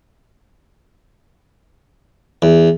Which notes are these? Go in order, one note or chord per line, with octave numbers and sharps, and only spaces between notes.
E2